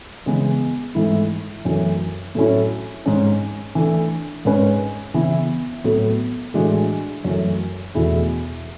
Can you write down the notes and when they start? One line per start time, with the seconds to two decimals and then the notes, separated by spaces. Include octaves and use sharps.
0.26 C#3 E3 G#3 B3
0.95 G#2 E3 A3 E4
1.65 F#2 E3 A3
2.35 A2 F#3 A3 C#4 E4
3.06 G#2 G#3 C#4
3.75 E3 A3 D4
4.45 G#2 G#3 C#4 G#4 B4
5.14 C#3 E3 B3 E4
5.84 A2 F#3 B3 F#4 A4
6.54 A2 E3 G#3 D4 F#4
7.24 F#2 E3 A3
7.95 E2 B2 A3 E4 G#4